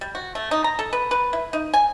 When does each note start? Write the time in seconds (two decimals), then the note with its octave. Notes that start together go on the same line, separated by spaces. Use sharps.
0.01 G3
0.15 F#4
0.35 A3
0.51 D#4
0.64 A#5
0.79 A4
0.93 B4
1.11 B4
1.33 E4
1.53 D#4
1.74 G#5